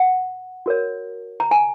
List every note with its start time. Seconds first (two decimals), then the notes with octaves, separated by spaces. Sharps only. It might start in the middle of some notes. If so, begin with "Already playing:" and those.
Already playing: F#5
0.66 F#4 A#4 C#5
1.40 A#5
1.51 G#5